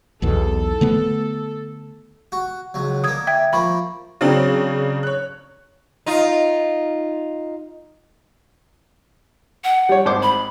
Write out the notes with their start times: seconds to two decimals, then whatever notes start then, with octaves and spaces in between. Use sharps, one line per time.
0.22 B1 E2 B2 A4
0.81 D3 A3 B3
2.32 F#4
2.74 C#2 F#3
3.04 D3 A#3 D#6 G#6
3.27 E5 G5 G#6
3.53 F3 A#3 B5 C#6
4.21 C#3 F#3 C4 D4
5.03 C#5 F#6
6.06 D#4 F4
9.64 F#5
9.89 G3 C#5
10.05 G#1 C5 D6
10.23 B5